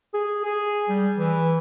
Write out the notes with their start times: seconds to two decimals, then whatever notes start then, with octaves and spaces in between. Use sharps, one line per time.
0.14 G#4
0.45 G#4
0.89 G3
1.17 E3